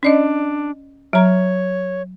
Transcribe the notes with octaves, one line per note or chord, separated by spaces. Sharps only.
C#4 D4 D5 D#5
F#3 C#5 A#5